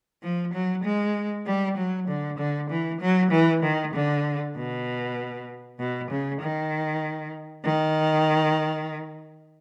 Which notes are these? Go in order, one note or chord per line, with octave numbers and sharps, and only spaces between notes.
F3
F#3
G#3
G3
F#3
D3
D3
E3
F#3
E3
D#3
D3
B2
B2
C#3
D#3
D#3